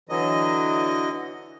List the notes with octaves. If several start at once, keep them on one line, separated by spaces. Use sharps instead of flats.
D3 E3 F#3 D#5